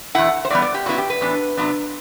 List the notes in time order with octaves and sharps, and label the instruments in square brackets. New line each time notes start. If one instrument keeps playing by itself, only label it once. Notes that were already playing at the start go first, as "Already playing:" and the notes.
[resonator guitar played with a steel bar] E2 B2 A3 E4 F#5
C5
A2 E3 G3 B3 D5
D5
G4
F#2 F#3 B3 E4 F#4
G4
B4
A2 E3 B3 D4
C3 F#3 B3 D4